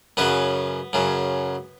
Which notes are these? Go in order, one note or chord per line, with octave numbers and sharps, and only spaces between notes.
F#2 C#3 F#3 B3 B4
F#2 C#3 F#3